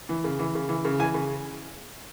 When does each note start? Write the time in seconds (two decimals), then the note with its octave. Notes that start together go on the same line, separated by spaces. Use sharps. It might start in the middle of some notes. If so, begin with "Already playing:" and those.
0.09 E3
0.24 C#3
0.39 E3
0.55 C#3
0.69 E3
0.85 C#3
0.99 E3 G#5
1.14 C#3